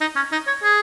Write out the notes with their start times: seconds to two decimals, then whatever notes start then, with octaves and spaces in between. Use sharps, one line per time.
0.01 D#4
0.16 C#4
0.32 D#4
0.47 C#5
0.63 G#4